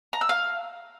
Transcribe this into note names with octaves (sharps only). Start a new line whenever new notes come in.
A#5
E6
F5